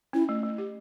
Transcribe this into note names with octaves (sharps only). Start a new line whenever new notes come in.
C#4 E4
A3
A3
G4